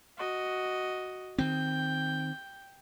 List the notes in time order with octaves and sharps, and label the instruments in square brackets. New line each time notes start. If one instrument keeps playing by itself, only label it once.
[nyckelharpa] F#4 D#5
[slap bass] D#3 C4 [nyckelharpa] G5